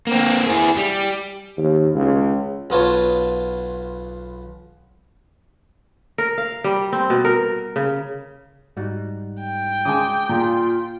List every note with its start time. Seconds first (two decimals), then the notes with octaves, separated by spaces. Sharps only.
0.07 A#3 C4
0.46 E4 G#4
0.77 G3
1.58 D#2
1.95 C#2
2.70 B1 B3 F4 C#5 A5
6.18 A#4
6.38 F5
6.64 G3
6.92 C4
7.10 B2
7.25 A#4
7.76 C#3
8.77 G#2 G3 D#4 F#4
9.41 G5
9.85 C#3 G#3 G#5 D6 D#6
10.29 A#2 F4 G#4